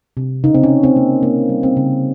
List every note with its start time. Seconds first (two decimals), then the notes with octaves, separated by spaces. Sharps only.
0.17 C3
0.44 C#3 D#4
0.54 C4
0.63 C#4
0.70 C#3
0.83 C4
0.97 A#3
1.23 A#3
1.49 G3
1.63 C4
1.77 C#3